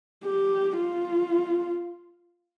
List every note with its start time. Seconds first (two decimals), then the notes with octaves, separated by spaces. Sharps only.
0.25 G4
0.77 F4